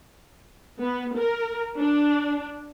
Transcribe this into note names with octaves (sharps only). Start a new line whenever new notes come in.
B3
A#4
D4